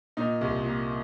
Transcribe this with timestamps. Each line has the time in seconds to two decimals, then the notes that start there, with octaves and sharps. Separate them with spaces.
0.17 A#2 D#4
0.41 C2
0.65 A#2